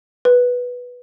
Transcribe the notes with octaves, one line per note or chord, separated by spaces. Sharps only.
B4